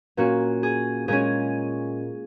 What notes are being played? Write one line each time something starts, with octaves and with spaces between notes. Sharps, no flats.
A#2 A#3 C#4 F#4
G#4
A#2 G#3 C#4 G#4